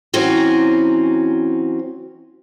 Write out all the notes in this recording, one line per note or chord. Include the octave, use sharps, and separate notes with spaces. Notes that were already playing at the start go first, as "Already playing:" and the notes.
E3 F#3 C4 C#4 F#4